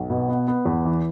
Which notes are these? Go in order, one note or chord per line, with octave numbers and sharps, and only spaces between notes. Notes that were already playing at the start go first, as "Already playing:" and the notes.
Already playing: B1
B2
B3
B3
E2
E3